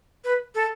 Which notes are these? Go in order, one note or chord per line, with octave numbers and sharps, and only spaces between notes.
B4
A4